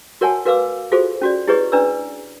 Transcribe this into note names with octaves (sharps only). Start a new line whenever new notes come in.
F#4 A#4 C#5 F#5 G#5 A5
F#4 A#4 B4 F5 D6 E6
F4 F#4 G#4 A4 C5
C#4 F#4 D5
E4 G4 G#4 B4 C#5 D#5
C#4 D4 B4 D5 A#5 E6